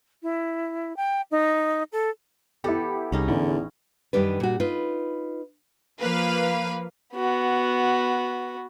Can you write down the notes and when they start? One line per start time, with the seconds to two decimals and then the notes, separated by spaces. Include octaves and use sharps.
0.23 E4
0.97 G5
1.31 D#4
1.93 A4
2.64 B3 E4 G4 A4
3.12 C2 C#4 D#4 G#4
3.28 A1 E2 D3
4.13 F#2 D#3 G3 D4 B4
4.40 A#2 F#4
4.60 D#4 F4 B4
6.01 F3 A#3 B4 F5
7.15 B3 F#4